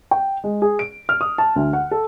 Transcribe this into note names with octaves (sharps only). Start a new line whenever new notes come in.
G5
G#3
G#4
D7
F6
D#6
A5
D2
F#5
A4